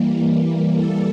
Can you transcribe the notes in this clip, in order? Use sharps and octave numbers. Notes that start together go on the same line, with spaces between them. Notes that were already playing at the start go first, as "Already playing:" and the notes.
Already playing: E3 G3 A#3
A4